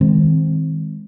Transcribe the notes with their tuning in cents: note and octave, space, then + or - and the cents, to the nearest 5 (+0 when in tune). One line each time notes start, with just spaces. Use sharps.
D#3 +25 G#3 -10 C4 +0